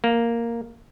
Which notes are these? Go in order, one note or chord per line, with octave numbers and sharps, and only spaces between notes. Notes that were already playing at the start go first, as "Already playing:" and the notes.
A#3